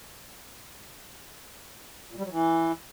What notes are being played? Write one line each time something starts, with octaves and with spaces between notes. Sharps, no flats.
A#2
G3
F#3
E3